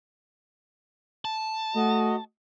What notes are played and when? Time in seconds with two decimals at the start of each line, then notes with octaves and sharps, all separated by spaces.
1.25 A5
1.75 A3 F#4 D#5